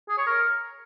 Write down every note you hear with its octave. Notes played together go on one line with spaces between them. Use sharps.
G#4
C#5
A#4